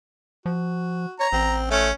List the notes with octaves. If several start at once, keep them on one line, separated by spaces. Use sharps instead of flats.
F3 F#4
C#5 A#5
A1 C4
A3 C#4